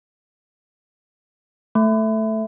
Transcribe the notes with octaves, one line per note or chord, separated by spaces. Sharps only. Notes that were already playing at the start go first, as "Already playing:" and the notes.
A3